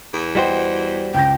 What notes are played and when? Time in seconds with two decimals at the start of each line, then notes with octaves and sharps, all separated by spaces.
0.14 E2
0.35 G3 F#4 C5 D#5 G5
1.14 C#2 G5 G6 A#6